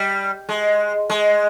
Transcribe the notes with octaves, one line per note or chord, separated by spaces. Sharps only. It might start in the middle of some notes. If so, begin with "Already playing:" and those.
Already playing: G3
G#3
G#3